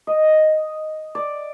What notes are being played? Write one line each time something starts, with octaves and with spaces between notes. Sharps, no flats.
D#5
D5